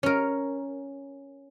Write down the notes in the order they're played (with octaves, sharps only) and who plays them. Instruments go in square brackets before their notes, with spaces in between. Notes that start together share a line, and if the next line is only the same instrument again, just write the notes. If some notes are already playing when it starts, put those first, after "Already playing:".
[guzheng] C#4 A#4